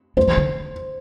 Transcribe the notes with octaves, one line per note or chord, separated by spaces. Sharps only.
A3 C5
E3
D3